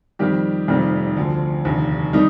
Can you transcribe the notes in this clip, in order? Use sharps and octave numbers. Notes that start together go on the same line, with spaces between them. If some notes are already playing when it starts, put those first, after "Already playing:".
F2 D#3 G3 G4
F1 F2 D#3 G3
D2 D3 F3
F1 D#2 D3
D#3 G3 D#4